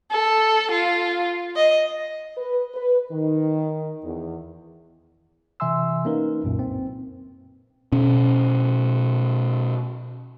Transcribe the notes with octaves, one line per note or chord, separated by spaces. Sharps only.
A4
F4
D#5
B4
B4
D#3
E2
C3 E3 E5 G#5 C6 E6
A#3 C#4 D#4 A#4 B4
C2 F#2 A#2
C4
B2 C#4